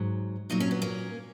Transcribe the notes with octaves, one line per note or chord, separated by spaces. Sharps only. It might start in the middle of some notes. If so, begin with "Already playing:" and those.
Already playing: G#2 F#3
A#2 F#3 D#4
C#4
B3
A#3 C#4